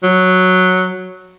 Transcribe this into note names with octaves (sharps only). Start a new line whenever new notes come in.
F#3